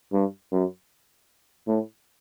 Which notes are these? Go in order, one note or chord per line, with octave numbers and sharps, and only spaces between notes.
G2
F#2
A2